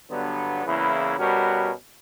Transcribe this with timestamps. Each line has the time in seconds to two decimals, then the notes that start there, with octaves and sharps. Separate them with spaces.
0.10 G2 D3 F#3 B3
0.65 E2 C#3 E3 A#3 E4
1.18 B2 G3 C#4 F#4 A#4